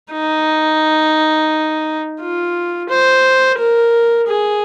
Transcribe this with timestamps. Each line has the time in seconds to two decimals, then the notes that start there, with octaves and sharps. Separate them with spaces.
0.12 D#4
2.20 F4
2.89 C5
3.59 A#4
4.28 G#4